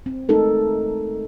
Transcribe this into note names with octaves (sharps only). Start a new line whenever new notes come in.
C4
G#3 A3 C4 D#4 A4 A#4